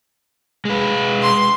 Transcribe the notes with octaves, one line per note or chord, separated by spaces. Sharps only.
G#3 B4
C6